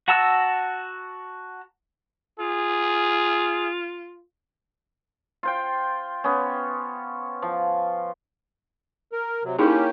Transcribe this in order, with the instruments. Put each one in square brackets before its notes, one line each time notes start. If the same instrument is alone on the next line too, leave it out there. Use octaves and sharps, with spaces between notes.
[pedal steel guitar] F#4 F#5 A5 A#5 E6
[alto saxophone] F4 [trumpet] G#4
[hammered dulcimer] F4 C5 G5
B3 C#4
F3
[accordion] A#4
C3 F#3
[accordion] A#3 C#4 G4 [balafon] D#4 E4 G#4